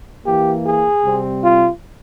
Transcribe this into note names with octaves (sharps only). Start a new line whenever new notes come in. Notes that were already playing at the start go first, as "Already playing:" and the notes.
E3 A#3 G4
G#4
C3 G3 C4
F4